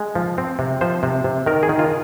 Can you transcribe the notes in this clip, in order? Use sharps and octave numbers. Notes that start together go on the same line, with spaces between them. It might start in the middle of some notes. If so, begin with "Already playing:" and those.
Already playing: G#3
F3
C4
C3
F3 C5
C3
C3
D#3 A#4
G#4
D#3
F4